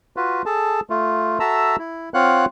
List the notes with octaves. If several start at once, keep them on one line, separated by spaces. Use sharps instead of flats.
F4 F#4 B4
G#4 A4 A5
A3 F4
F#4 A4 E5 A5 A#5 E6
E4
C4 F4 C#5 F5 F#5 F#6